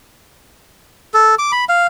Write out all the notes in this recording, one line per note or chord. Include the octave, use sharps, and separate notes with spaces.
A4
D6
B5
F5